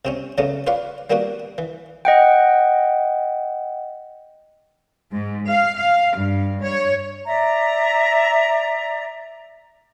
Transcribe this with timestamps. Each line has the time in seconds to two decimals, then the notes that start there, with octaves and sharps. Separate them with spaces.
0.05 C3 C4 C#4
0.38 C#3 F#3 A3 B3 C#4
0.67 F4 B4 C#5 D5 F5
1.10 G3 A#3 B3 D4 F#4
1.58 E3
2.05 D#5 F#5 G5
5.14 G#2
5.50 F5
5.80 F5
6.17 G2
6.64 C#5
7.27 D5 E5 A#5